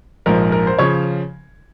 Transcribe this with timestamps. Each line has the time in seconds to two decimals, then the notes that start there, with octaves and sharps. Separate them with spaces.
0.26 A#1 G#2 F3 A#4
0.52 A#4
0.67 C5
0.79 C#3 F3 C#5